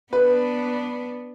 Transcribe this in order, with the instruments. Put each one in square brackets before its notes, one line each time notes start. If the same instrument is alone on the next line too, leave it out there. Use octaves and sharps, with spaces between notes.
[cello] B3 D4 [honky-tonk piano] B4